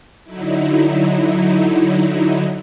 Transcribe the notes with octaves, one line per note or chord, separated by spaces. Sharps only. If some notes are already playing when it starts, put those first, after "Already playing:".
D3 F#3 D#4 E4